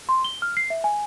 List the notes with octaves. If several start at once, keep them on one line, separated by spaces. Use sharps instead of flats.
C6
G7
F6
C7
E5
G#5